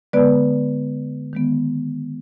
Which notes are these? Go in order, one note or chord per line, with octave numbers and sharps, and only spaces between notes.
D3 G#3 B3 B4 D5
D#3 G#3 B3